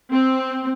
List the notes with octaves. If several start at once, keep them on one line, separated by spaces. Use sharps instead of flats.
C4